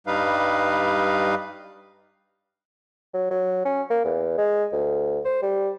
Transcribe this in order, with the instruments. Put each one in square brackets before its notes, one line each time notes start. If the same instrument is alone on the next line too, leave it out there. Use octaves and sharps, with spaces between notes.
[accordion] G2 G3 D#4 B4 F5
[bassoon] F#3
F#3
C#4
A#3
E2
G#3
D2
C5
G3